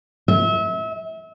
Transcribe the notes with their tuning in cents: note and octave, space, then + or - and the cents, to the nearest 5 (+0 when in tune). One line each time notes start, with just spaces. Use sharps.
E5 -30